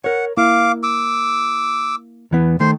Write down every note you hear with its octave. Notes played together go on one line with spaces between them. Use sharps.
A#4 C#5 F#5
A#3 E4 F5 D6
D6 E6
E2 E3 B3
D#3 A3 C5 C6